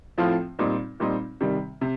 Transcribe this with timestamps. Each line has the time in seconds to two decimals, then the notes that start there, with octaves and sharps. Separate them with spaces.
0.18 A2 F3 C4 F4
0.59 A#2 G3 C4 D#4
1.00 A#2 G3 C4 D#4
1.41 C3 D#3 G3
1.81 C3